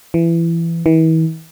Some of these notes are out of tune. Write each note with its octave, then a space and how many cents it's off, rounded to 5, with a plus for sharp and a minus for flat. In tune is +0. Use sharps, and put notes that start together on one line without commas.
E3 +20
E3 -40